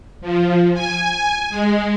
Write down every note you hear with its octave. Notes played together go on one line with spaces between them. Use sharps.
F3
G#5
G#3